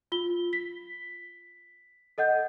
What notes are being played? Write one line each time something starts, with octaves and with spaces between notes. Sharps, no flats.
F4 G7
B6
A4 D#5 F#5 G6